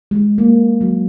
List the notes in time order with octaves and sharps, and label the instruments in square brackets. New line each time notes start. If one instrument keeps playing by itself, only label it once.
[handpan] G#3
A#3
F#3